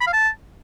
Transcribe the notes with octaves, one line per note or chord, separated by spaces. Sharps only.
B5
F5
A5